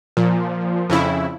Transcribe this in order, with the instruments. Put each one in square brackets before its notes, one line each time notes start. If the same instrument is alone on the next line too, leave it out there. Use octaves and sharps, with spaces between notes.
[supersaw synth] A#2 [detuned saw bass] F3
[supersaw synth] F2 C#3 E4